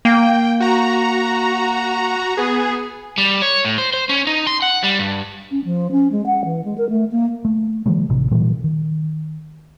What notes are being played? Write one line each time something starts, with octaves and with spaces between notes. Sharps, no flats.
A#3 G5
F#4 A#5
B3 G#4
G3
C#5
A2
C5
C5
C#4
D#4
C6
F#5
G3
G2
C#4
F3
C#4
G#3
F#5
E3
G#3
A#4
A3
A#3
A3
D#3 F3 G3 A3
A1 C3
A#2 E3 F#3 G3
D#3